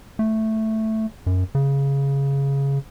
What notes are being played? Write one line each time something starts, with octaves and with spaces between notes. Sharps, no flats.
A3
F#2
C#3